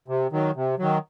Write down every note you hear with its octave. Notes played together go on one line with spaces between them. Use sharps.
C3
D#3 F#3
C3
D#3 F#3